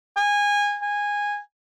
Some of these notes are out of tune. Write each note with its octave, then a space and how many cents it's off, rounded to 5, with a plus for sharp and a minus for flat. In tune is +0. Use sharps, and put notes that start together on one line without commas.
G#5 -20
G#5 -15